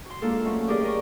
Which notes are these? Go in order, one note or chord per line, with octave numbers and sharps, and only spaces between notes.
F#4 C6
G#3 A#3 D4 F4 A4
F3 F#3 A3 C#4
G4 G#4 A#4 D5 D#5 G5
A#4 D#5 C#6